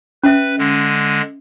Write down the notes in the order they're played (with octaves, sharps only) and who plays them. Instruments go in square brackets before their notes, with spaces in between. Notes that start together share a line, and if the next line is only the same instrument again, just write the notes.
[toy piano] C#4 E5 [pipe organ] B4
[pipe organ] D3 G#3